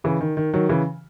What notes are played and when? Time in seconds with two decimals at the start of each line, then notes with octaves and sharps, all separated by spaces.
0.04 C#3 E3
0.21 D#3
0.37 D#3
0.54 D#3 F#3
0.69 C#3 E3